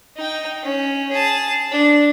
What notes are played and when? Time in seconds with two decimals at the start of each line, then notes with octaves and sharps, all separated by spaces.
0.16 D#4 G5
0.63 C#4
1.12 G#4 A5
1.71 D4